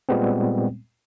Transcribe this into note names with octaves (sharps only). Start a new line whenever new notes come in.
A#2 G3 G#3 B3 C4